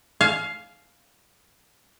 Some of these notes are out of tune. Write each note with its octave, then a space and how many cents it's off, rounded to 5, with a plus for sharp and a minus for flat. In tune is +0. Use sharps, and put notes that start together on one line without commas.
F5 +0 G#5 +45